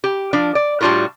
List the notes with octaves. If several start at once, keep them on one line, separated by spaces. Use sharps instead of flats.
G4
F3 D4
D5
A2 G3 D4 F4 F#4 A#4